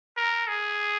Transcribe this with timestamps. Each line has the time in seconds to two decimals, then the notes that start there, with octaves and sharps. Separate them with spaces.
0.17 A#4
0.48 G#4